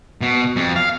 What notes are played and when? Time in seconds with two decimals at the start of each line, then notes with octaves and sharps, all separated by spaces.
0.21 B2
0.56 F2
0.76 F5